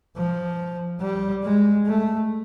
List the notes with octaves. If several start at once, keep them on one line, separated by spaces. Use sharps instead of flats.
F3
G3
G#3
A3